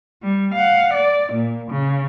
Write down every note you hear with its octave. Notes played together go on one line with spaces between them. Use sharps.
G3
F5 F#5
D5
A#2
C#3